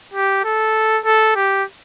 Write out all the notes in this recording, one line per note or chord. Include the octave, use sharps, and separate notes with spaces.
G4
A4
A4
G4